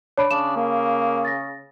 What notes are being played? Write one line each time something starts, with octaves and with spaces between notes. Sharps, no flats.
D4 C#5 B5 D7
C#3 D4 B5 E7
A#3
A6 A#6